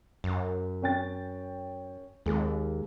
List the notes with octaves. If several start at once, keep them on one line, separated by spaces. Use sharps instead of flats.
F#2
C#4 G5 A6
D#2 G#3